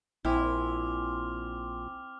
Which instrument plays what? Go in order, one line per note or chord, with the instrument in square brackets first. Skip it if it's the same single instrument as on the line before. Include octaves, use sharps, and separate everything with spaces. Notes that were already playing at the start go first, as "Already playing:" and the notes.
[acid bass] A#1 [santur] C4 G#5 [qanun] E4 [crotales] D6 F6